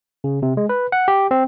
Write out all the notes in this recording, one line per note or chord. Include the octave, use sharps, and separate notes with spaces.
C#3
C3
G#3
B4
F#5
G4
C4